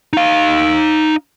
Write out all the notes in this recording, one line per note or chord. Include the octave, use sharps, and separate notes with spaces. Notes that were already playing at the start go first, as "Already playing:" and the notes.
D#4 F5